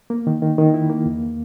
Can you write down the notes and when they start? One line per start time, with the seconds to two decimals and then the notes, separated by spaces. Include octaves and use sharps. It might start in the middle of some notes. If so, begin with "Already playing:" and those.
0.10 A#3
0.27 D#3
0.42 D#3
0.58 D#3
0.74 E4
0.90 A#3
1.05 E2